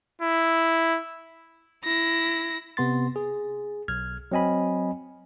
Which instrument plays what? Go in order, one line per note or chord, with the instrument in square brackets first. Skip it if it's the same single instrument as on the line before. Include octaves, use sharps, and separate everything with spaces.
[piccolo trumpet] E4
[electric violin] E4 A#6
[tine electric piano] C3 B3 C6 A6
G#4
B1 F6 G#6
F#3 C4 D#5 G#5 B5